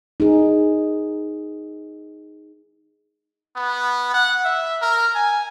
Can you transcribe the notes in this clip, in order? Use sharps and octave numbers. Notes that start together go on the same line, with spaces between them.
D#4 G#4
B3
F#5
E5
A#4
G#5